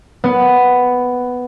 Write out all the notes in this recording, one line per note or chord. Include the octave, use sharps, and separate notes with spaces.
B3